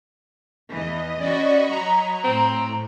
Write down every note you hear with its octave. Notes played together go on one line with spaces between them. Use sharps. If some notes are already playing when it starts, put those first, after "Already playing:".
E2 E3 D#5
C#4 F#4 D5 D#5 B5 C#6
F#3 A#5
A2 C4